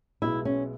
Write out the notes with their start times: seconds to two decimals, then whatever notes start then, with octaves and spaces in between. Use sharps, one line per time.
0.22 B1 B2 G#3 B3 E4
0.45 C#4